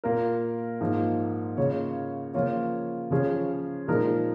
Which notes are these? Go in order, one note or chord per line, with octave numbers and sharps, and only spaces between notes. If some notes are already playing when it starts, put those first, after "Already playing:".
A#2 A#3 F4 A#4
G#2 F3 A#3
C#3 A#3 F4 C#5
C#3 F3 A#3 F4 C#5
C#3 F3 C#4 G#4 C#5
A#2 F3 G#3 D#4 A#4